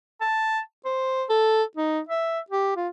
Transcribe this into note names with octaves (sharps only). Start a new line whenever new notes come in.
A5
C5
A4
D#4
E5
G4
F4